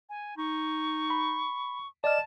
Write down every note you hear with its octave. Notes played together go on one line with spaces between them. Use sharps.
G#5
D#4 C#6
B5
D5 D#5 A5 F6 E7